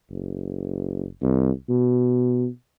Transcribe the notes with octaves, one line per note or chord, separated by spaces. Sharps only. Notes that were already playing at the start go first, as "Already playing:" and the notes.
F#1
C2
B2